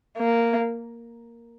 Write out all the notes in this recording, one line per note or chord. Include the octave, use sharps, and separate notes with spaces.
A#3